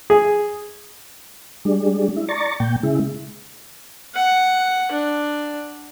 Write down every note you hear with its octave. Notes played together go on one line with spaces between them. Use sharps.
G#4
G3 G#3 D4
E4
D5 A#5 C#6 A6
A#2 G5
C#3 G#3 E4
F#5
D4